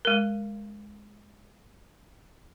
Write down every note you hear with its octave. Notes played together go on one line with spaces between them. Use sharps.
G#3 A#4